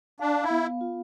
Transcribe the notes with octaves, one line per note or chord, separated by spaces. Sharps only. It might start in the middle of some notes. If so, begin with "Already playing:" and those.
D4 F5
E4
B3
F4